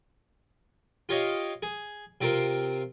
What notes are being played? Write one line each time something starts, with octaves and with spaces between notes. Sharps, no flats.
F4 G4 C#5 D#5 F5
G#4
C3 C4 F4 A#4